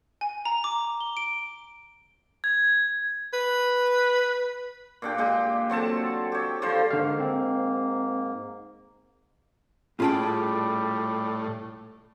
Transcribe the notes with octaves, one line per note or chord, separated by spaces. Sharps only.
G#5
A#5
D6
G7
D7
G#6
B4
A#2 D4 G4
A#2 G#3 G4
F#3 C4 A4 A5
G4 C#5
D3 F3 G3 C5
G#2 D3 A#3 F5
C4
A2 G3 C#4 F4 G#4 G5 A5